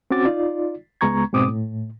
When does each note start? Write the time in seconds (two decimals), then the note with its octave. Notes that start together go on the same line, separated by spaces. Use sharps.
0.11 C4 C#4 F#4 D6 A6
0.25 D#4 F4 D5
1.01 C#2 G#3 B3 A#5 C#6 G#6
1.33 G#2 B2 C4 D6 D#6
1.48 A2